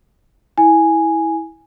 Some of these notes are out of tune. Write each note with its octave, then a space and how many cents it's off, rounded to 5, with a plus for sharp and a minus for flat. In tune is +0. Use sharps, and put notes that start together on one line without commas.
E4 -15 G#5 +0